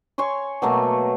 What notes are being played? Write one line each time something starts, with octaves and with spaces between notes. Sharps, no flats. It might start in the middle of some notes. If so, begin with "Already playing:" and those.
C#5 G#5 C6 C#6
B2 F#3 A3 A#3